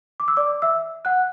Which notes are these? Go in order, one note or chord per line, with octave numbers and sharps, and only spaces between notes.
D6
E6
D5 D6
E5 E6
F#5 F#6